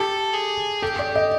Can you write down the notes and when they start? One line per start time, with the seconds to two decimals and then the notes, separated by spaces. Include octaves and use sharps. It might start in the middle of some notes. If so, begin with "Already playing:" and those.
Already playing: G4 A4
0.33 G#4
0.82 G4 A4
0.99 D5
1.16 D#5